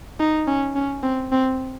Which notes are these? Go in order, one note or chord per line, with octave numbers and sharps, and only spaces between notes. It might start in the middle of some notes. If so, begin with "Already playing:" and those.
D#4
C#4
C#4
C4
C4